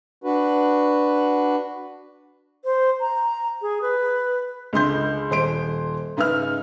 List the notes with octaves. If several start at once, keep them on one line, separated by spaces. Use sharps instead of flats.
D4 F#4 B4
C5
A#5
G#4
B4
C#2 D3 C6 G6
D#1 C5 C6 D7
G#2 C#3 D#4 B4 E5 F6